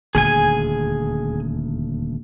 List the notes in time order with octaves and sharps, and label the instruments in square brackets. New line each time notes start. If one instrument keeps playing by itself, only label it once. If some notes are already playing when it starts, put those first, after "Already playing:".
[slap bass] D#1 D2 [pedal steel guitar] G#4 G#5